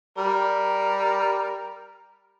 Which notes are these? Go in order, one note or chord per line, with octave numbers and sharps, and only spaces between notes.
G3 A#4